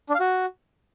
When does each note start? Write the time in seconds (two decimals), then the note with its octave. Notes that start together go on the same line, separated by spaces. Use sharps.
0.09 D4
0.15 F5
0.20 F#4